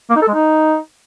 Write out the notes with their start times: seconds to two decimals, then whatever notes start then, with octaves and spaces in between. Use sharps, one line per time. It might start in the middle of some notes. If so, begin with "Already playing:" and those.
0.10 A#3
0.16 D#4
0.22 A4
0.28 G#3
0.34 D#4